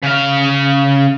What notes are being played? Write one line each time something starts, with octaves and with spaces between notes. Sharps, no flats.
C#3 F5